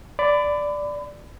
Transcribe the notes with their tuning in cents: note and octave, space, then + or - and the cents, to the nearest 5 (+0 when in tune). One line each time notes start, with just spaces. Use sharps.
D5 +0 B5 +30